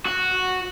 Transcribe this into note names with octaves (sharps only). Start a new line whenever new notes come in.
F#4